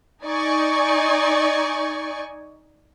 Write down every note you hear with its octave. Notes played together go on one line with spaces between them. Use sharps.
D#4 D5 G#5 C#6